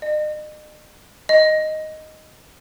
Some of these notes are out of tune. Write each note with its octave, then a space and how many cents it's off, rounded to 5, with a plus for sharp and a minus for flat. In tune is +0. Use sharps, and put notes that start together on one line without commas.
D#5 -40
D#5 +0